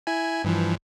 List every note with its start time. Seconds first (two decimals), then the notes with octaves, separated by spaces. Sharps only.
0.07 E4 G#5
0.44 G2 E3 F3